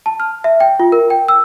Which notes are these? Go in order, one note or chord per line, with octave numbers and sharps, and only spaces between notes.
A5
F6
E5
G5
F4
A#4
G5
E6